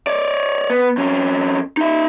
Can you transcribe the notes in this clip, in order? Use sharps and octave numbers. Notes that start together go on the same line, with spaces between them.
C#5 D5
B3
F2 C#4
D#4 E5